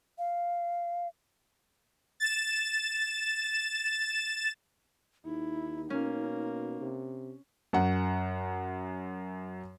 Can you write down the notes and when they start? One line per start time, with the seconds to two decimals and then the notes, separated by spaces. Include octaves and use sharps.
0.18 F5
2.20 A6 E7
5.25 D#2 D#4 E4
5.90 B2 A#3 C#4
6.81 C3
7.73 F#2 F#5